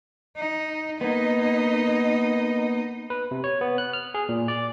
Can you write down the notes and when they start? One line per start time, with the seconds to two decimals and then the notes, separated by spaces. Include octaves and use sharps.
0.37 D#4
1.01 A#3 B3 D#4 D#5
3.10 B4
3.31 C3
3.44 C#5
3.61 B3
3.78 F#6
3.93 F6
4.14 G#4
4.29 A#2
4.48 D5